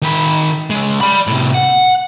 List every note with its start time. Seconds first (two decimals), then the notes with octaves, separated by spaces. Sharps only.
0.02 D#3 B5
0.70 C#3 G#3
1.01 D5 B5
1.27 A2 C3
1.54 F#5